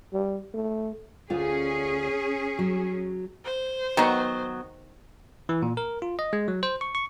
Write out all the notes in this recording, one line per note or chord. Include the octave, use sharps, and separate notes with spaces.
G3
A3
D2 C#4 F4 G#4
F#3
C5
D#3 F#3 B3
E3
A#2
A#4
F4
D#5
G#3
F#3
C5
C#6
C#6